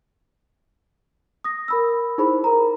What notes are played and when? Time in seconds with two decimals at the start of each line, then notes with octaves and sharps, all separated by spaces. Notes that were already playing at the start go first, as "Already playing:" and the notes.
1.44 D#6 A#6
1.68 A#4 B5 E6
2.18 D#4 E4 G#4 C5 B5
2.44 A#4 A#5